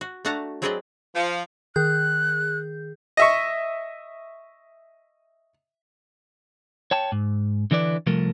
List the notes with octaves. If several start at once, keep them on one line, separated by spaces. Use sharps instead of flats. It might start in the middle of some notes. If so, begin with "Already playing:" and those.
F#4
A3 D4 F#4 F#5 A5 A#5
F#3 C4 G#4 B4 D5 D#5
F3
D#3 G#4 F#6 G6
D#5 E5 C#6
C#5 G5 A5
G#2
D3 E3 D4 B4 D5
C2 F3 A3 A#4